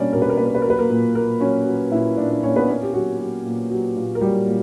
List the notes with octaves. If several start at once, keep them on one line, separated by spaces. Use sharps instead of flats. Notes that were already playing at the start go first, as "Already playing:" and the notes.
Already playing: B2 G3 A#3 C#4 D4 C#5 D5
B2 A#4
B4
A#4
A#3 B4
A#4
B4
F#3 A#4
B4
A#3 A#4
A#2
A#3 A#4
F#3 C#4 C#5
F#3
A#2 E4 E5
A#2 D4 D5
D4 D5
A#2 C#4 C#5
B3 B4
A#3 C#4 C#5
G4
F#3 F#4
F#3
A#2
F#3
A#2
A#4
F#3 G3 G4
A#2